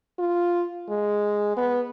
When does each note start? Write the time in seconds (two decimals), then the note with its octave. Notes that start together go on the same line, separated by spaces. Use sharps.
0.19 F4
0.90 G#3
1.57 B3